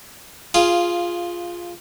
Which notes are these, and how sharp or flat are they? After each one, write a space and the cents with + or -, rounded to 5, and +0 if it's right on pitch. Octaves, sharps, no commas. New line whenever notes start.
F4 +0 G#4 +0 F5 -10